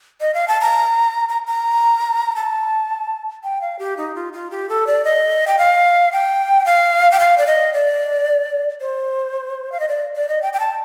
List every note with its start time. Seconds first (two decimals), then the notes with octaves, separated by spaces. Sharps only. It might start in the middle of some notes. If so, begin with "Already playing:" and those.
0.21 D#5
0.34 F5
0.48 A5
0.61 A#5
1.29 A#5
1.47 A#5
2.36 A5
3.44 G5
3.61 F5
3.79 G4
3.97 D#4
4.15 F4
4.33 F4
4.51 G4
4.69 A4
4.87 D5
5.05 D#5
5.47 G5
5.58 F5
6.12 G5
6.66 F5
7.12 G5
7.20 F5
7.38 D5
7.47 D#5
7.73 D5
8.81 C5
9.72 F5
9.80 D#5
9.89 D5
10.15 D5
10.29 D#5
10.42 G5
10.53 G5
10.60 A5